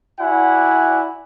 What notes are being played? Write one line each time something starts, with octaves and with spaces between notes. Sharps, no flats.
E4 F#4 D5 F#5 G#5